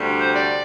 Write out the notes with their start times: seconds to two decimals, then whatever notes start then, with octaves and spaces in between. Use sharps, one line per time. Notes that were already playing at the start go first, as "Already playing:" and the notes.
Already playing: D2 C3 G3 D4
0.18 C5
0.33 D5